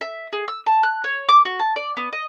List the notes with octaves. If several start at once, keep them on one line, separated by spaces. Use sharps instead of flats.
E5
G#4
E6
A5
F#6
C#5
D6
F#4
A5
D5
B3
D#5